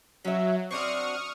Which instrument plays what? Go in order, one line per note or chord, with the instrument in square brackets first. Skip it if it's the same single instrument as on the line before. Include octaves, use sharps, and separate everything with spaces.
[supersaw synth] F#3 [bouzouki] C#4 E5
[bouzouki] C4 D4 F#4 [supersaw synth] C#6 D#6 F6